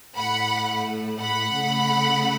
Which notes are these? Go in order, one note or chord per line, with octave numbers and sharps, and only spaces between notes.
A2 A3 F#5 B5
F#5 B5
C#3 A3